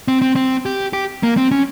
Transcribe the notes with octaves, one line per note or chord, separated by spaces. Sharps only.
C4
C4
C4
G4
G4
A#3
C4
C#4